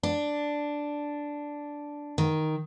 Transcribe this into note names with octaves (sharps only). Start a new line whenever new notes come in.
D4
D#3